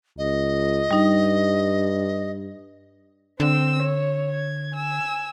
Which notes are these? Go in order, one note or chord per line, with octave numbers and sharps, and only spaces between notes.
C#2 D#5
G2 G3 D#4
D3 C4 E6
C#5
G#6
G#5 E6